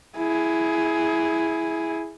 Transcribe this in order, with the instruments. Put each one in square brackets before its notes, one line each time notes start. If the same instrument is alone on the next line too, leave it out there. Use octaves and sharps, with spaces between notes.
[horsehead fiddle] E4 G#4